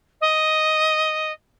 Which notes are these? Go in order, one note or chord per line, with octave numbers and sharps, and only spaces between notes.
D#5